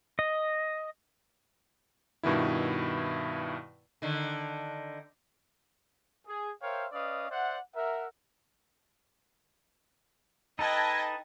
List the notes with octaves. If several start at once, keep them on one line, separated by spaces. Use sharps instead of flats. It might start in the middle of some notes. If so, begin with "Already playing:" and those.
D#5
G2 B2 D#3 E4
D3 D#3
G#4
A#4 C5 C#5 E5 F5 G5
C#4 B4 D5 D#5 F5 D#6
C5 D5 E5 F#5
A#4 E5 F#5
D#4 A4 B4 D#5 G5 A5 G#6 A#6